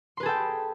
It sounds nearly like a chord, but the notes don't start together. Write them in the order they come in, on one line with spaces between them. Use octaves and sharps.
C6 B4 G#4 A4 G5